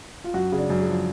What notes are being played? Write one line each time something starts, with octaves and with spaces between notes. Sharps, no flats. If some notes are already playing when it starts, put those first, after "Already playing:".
F4
F#2 F#4
C#3
D4
F#2
G#4
F3